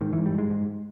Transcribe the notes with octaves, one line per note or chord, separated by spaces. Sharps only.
G#2 D#3
G#2 E3
G3
G#2 G#3
G#2